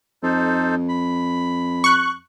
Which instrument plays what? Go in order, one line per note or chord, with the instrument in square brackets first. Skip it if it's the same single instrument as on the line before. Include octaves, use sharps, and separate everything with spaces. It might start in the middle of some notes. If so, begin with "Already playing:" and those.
[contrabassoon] F2 [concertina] D#4 A4 C5
[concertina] B5
[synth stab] C#6 F#6